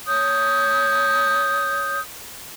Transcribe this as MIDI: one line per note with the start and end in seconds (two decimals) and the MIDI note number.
0.07 1.99 73
0.07 1.99 87
0.07 1.99 91